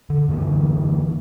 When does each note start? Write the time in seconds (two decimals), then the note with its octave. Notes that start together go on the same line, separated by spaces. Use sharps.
0.10 D3
0.28 F#2 D3 E3 A#3